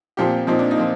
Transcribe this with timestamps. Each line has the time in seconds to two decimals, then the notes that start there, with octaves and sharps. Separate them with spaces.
0.17 A#2 F3 C4 G4
0.47 A#2 F3 C4 D#4
0.59 D4
0.71 D#4
0.77 A#2 F3 C4